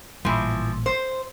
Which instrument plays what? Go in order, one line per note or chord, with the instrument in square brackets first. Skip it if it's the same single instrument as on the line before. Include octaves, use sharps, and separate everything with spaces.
[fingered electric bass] A1 A#2 G3 [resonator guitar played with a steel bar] E3 F3
[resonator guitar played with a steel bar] C5